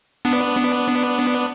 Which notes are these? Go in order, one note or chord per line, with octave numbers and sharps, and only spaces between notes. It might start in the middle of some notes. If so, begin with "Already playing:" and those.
B3 D4